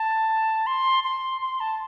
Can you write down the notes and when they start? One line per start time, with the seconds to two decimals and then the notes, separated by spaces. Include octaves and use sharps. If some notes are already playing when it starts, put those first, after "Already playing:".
Already playing: A5
0.67 C6
1.04 C6
1.42 C6
1.60 A5